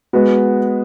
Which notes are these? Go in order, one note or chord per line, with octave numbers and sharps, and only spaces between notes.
G#3 B3 F#4 B4